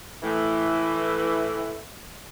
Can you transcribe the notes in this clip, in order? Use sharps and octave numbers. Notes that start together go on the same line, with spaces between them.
A2 E3